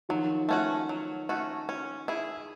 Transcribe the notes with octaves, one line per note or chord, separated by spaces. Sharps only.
D#3 F3 F#3
A3 C#4 F#4
F#3
A3 C#4 F#4
C#4
E4 G#4